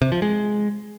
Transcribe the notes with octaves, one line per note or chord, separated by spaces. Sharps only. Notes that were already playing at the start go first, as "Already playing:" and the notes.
C3
F3
G#3